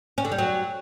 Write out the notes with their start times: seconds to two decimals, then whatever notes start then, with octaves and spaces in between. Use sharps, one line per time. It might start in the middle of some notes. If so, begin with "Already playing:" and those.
0.18 C#4
0.25 D3
0.32 G3
0.38 F#3